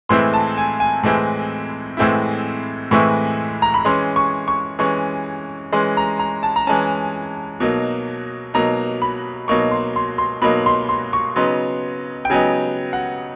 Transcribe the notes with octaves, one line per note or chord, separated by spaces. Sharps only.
A2 E3 G#3 C4 E4 C6
A5
G#5
G#5
A2 E3 G#3 C4 E4
A2 E3 G#3 C4 E4
A2 E3 G#3 C4 E4 C#6
A#5
B5
E3 G#3 C#4 C6
C#6
C#6
E3 G#3 C#4 C#6
E3 G#3 C#4 C6
A#5
A#5
A5
A#5
E3 G#3 C#4 A5
B2 F#3 A#3 D#4
B2 F#3 A#3 D#4 A#5
B5
B2 F#3 A#3 D#4 C#6
C6
C6
C6
B2 F#3 A#3 D#4 B5
C6
C6
C#6
C#3 F#3 B3 D#4 C6
G5
C#3 F#3 B3 D#4 G#5
F#5